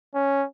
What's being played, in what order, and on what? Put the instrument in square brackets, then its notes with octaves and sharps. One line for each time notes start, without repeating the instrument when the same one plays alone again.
[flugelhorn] C#4